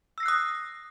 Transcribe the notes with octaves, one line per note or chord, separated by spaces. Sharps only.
D#6 E6 F#6 A#6 C7